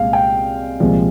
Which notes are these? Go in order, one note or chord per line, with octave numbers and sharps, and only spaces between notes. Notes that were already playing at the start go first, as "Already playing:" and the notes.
Already playing: C2 A#2 G#3 F5
G5
C2 A#2 F3 G#3